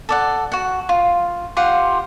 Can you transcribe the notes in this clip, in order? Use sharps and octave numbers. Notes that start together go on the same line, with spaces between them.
A4 D5 F#5
F#4 F#5
F4
F4 G4 F#5 C6